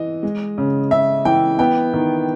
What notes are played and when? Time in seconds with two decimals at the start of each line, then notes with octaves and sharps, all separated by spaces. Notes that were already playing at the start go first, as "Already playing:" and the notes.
Already playing: E3 D#5
0.23 G#3
0.58 C#3
0.91 C#3 E5
1.25 E3 G5
1.59 B3 G5
1.93 D#3